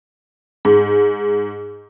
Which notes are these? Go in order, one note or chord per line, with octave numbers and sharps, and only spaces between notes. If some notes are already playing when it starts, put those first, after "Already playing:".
G#2